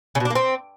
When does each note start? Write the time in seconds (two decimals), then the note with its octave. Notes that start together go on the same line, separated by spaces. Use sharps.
0.15 C#3
0.20 B2
0.25 D4
0.30 A#3
0.35 C4